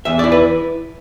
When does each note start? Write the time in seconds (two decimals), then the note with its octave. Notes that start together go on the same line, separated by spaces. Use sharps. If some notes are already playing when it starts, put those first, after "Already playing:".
0.05 E2 E5
0.19 E4 D5
0.32 B4